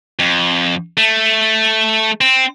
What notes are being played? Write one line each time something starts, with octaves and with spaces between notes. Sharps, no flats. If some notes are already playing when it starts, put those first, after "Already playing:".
F2
A3
C4